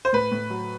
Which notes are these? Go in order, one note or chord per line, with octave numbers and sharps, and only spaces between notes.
C5
A2 B4
A2
F#3